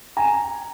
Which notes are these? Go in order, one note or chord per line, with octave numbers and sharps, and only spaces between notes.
G#5 A#5